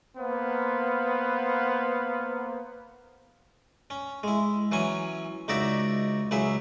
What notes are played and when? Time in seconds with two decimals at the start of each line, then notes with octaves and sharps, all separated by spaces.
0.18 A#3 B3 C5 F5 F#5
3.90 C#4
4.23 G#3 E4
4.71 E3 F#3 C#4 G#5
5.48 C#2 D#4 F#4 D5 E5
6.31 C#2 F#3 E4 G#4 E5